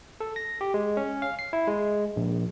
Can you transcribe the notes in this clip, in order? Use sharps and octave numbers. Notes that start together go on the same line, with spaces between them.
A4
A#6
G4
G#3
C#4
F5
C7
E4
G#3
A#1